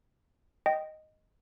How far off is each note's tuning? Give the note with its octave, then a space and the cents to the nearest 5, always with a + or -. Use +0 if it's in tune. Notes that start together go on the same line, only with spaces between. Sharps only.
D#5 +0 G5 -10